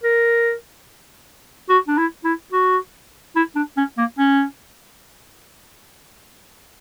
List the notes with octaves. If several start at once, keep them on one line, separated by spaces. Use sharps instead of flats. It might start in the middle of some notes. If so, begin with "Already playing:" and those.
A#4
F#4
D4
E4
E4
F#4
E4
D4
C#4
A#3
C#4